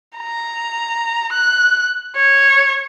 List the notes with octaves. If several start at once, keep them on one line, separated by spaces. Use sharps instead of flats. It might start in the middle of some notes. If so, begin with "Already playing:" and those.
A#5
F#6
C#5